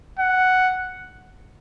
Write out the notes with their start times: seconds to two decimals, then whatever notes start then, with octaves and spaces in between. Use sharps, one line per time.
0.19 F#5